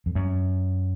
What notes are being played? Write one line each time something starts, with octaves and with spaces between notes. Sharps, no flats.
F2
F#2